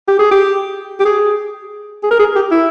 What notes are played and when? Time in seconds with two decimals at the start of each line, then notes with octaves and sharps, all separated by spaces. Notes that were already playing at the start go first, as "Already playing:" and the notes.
0.08 G4
0.19 G#4
0.31 G4
1.00 G4
1.05 G#4
2.03 G#4
2.11 A#4
2.19 G#4
2.36 G4
2.51 E4